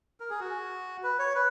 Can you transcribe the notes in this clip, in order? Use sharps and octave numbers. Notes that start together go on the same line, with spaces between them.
A#4
G#4
F#4
B4
C#5
B4